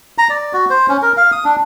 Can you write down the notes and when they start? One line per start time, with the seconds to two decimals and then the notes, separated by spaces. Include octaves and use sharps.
0.18 A#5
0.30 D5
0.53 F#4
0.70 C5
0.89 C#4
1.02 A#4
1.17 F5
1.32 D#6
1.45 D4